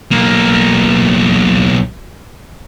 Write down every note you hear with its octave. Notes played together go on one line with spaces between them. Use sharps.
B1 A#3